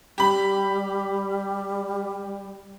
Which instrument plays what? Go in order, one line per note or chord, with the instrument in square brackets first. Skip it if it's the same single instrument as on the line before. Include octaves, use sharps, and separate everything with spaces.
[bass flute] G3 [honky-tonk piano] G4 B5